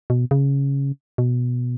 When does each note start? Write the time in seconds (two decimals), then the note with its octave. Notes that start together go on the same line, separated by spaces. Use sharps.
0.10 B2
0.31 C#3
1.18 B2